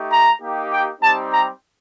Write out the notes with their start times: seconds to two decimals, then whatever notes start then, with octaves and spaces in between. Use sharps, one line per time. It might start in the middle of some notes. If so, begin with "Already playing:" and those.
Already playing: A3 D#4 G4
0.10 A#5
0.41 A#3 D#4 G4
0.71 G5
1.01 G3 C4 D#4 G4 A5
1.31 A#5